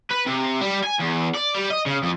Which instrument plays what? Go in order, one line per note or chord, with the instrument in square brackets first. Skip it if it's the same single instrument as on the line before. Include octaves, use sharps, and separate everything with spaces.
[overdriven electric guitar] B4
C3
G3
G#5
E2
D5
G3
D#5
C#3
F2